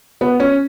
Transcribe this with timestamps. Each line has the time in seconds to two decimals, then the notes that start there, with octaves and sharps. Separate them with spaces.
0.21 B3
0.40 C#4